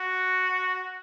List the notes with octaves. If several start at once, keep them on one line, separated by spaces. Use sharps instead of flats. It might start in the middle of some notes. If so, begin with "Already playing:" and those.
Already playing: F#4